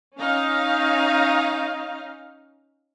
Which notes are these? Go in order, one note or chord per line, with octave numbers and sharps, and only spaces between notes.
C#4 D#4 F5